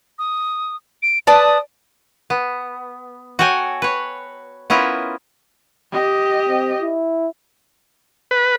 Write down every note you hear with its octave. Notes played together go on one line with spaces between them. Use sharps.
D#6
D7
B4 D5 A5 D#6
B3
F#4 A4 C#5 G5 G#5
B4 C#5
B3 C#4 E4 F4 A#4 E5
G4 D#5
C4
E4
B4